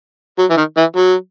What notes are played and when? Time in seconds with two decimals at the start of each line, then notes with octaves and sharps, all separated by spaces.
0.39 F#3
0.50 E3
0.57 D#3
0.77 E3
0.96 F#3